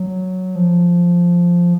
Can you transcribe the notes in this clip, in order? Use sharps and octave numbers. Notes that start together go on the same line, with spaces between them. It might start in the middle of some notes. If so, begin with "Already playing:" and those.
Already playing: F#3
F3